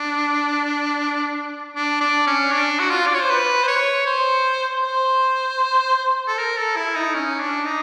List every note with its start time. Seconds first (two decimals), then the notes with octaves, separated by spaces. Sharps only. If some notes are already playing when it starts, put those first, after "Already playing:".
Already playing: D4
1.76 D4
2.01 D4
2.27 C#4
2.52 D4
2.80 F#4
2.90 F4
3.07 D5
3.14 C#5
3.22 C5
3.30 B4
3.63 C5
3.68 C#5
4.06 C5
4.83 C5
6.27 A4
6.38 A#4
6.57 A4
6.76 E4
6.95 D#4
7.14 C#4
7.40 D4
7.66 D#4